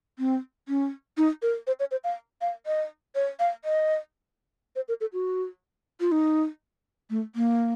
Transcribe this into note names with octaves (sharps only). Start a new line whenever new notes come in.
C4
C#4
D#4
A#4
C5
C#5
C5
F5
F5
D#5
C#5
F5
D#5
C5
A#4
A4
F#4
F4
D#4
A3
A#3